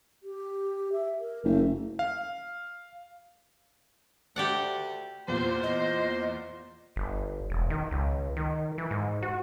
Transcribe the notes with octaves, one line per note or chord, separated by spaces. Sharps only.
G4
E5
A#4
F#1 A3
F5
D2 A3 F#4 G4 D5 F#5
E2 A#2 C5
D#5
G1
E1
D#3
C#2
D#3
E3
G#2
F#4